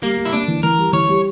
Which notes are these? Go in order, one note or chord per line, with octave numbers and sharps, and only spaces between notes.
G3 A#3
G3
E4
A#3 D4
E3
E3 A#4
G3
E3 C#5
G3